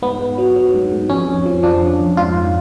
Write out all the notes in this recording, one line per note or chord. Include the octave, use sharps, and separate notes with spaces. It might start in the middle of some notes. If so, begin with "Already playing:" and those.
G#2 B3
G#2
F#3
F#3
G#2
G#2
F2 C#4
F2
F3
F3 D4
F2
F2
G#2 F4
G#2